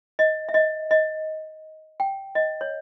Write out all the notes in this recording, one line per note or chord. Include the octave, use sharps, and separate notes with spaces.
D#5
E5
D#5
D#5
G5
D#5
C#5